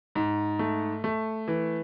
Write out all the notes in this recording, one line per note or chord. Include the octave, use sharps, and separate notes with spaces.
G#2
A3
A3
E3